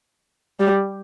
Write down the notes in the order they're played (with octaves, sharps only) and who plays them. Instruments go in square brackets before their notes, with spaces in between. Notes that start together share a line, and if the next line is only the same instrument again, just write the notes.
[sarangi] G3